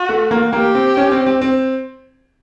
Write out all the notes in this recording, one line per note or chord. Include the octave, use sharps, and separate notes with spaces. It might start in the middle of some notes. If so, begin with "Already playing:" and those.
Already playing: F#4
A3
A#3
A#3 G4
C4
C#4
C4
C4
C4